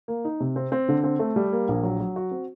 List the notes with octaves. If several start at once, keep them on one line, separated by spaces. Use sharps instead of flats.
A#3
D#4
C3
C4
C4
D3
C4
A3
G3
A#3
A#1
F#3
F#3
F#4
C4